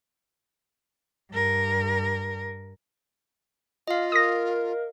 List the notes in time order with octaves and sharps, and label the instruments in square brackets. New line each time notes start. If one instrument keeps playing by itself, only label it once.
[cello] G2 A#4
[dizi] F4 [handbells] D#5 F5
[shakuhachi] A#4 [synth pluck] D#6 A#6